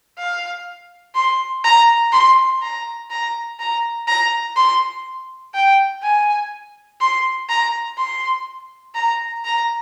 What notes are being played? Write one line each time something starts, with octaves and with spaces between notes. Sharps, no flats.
F5
C6
A#5
C6
A#5
A#5
A#5
A#5
C6
G5
G#5
C6
A#5
C6
A#5
A#5